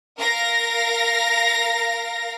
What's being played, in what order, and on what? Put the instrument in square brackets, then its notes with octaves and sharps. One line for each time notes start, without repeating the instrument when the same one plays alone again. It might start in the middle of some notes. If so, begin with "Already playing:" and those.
[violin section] A#4 F5 A#6